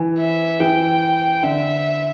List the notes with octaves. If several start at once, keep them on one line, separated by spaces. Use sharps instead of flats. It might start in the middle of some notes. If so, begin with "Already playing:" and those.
Already playing: E3
E5
E3 G5
D3 E5